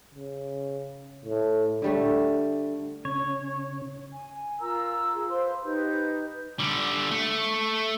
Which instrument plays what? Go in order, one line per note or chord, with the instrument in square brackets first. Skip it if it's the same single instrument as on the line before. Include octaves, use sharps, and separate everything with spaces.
[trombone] C#3
A2
[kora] D3 G3 A3
[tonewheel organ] C#3 C#4 [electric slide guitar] C#5
[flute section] G#5
F4 A#4 A#5 E6
G#4
B4 C5 F5 C6
D#4 G4 B4 G6
[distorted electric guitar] D3 G3
A3